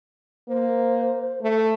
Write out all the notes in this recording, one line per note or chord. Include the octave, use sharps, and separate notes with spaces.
A#3 C5
A3